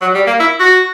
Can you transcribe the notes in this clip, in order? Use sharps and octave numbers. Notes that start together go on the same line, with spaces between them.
F#3
G3
A#3
E4
F#4